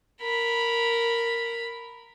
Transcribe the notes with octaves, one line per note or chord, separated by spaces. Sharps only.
A#4 B5